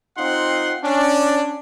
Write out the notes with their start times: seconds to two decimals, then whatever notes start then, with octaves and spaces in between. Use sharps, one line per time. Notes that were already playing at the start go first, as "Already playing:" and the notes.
0.17 C4 D#4 F4 F#5 C6
0.84 C#4 D4